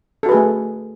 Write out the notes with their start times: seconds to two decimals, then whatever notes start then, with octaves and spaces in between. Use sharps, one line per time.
0.23 A4
0.26 F#4
0.29 B4
0.32 G#4
0.34 A3